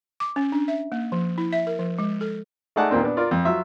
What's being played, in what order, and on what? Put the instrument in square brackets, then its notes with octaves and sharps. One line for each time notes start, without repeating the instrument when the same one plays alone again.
[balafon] D6
C#4
D4
E5
A#3
F3
E4
E5
A#4
F3
G#3
A4
[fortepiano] A3 D#4 G#4 D5 F#5 A5
D#2 A#2 A#3 C4 D4
B3 D4
F4 A#4 D5
F2
F#3 F4 E5 E6